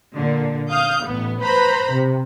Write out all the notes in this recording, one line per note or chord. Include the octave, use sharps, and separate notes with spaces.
A#2 D3
F5 D#6 G6
A1 B3
B4 C5 A#5 B5
C3